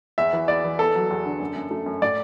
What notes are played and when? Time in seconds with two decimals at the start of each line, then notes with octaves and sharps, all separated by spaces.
0.18 E2 E5
0.33 E3
0.48 E2 D5
0.64 E3
0.79 B3 A4
0.95 F#3
1.11 E2
1.26 D3
1.40 F#2
1.55 F#2
1.71 A3
1.86 F#2
2.02 A2 D5